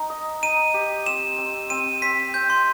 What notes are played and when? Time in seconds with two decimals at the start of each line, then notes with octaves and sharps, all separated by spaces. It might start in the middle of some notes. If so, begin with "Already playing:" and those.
Already playing: D#4
0.10 D#5
0.43 D#4 D#7
0.74 G4
1.06 C4 E7
1.38 C4
1.70 C4 D#7
2.02 C4 B6
2.34 C4 G6
2.50 C6